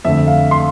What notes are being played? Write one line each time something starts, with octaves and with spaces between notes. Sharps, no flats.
F2 D3 A3 E5
F5
C6